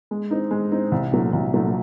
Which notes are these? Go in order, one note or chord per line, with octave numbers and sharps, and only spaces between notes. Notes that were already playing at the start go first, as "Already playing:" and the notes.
G#3
C4 D#4
G#3
C4 D#4
C2
A#2 F#3 A3
C2
A#2 F#3 A3